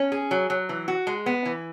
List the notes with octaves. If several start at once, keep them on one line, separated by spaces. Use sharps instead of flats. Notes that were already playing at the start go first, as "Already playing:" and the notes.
Already playing: C#4
G#4
F#3
F#3
E3
F#4
G#3
B3
E3